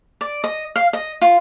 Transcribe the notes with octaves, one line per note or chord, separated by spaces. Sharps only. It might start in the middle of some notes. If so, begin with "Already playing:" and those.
D5
D#5
F5
D#5
F4